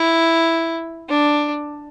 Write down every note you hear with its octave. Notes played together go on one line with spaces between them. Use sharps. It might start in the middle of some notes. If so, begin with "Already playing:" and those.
Already playing: E4
D4